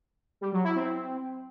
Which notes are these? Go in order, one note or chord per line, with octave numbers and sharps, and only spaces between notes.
G3
F#3
E4
C4